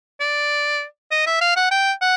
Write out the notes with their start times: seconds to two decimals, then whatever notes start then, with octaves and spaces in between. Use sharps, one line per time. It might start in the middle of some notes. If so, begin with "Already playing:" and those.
0.20 D5
1.11 D#5
1.27 E5
1.41 F5
1.56 F#5
1.71 G5
2.01 F#5